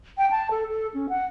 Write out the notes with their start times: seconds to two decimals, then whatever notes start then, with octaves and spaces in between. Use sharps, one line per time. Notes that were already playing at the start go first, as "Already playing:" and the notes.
0.18 G5
0.31 A5
0.51 A4
0.69 A4
0.94 C#4
1.09 F#5